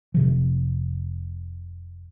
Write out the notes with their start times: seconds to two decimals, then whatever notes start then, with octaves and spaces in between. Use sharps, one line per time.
0.14 F1 C3 F3